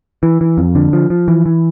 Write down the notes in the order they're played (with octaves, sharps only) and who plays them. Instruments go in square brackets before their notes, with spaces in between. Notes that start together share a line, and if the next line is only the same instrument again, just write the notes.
[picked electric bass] E3
E3
F2
D3
F3
F3
E3
E3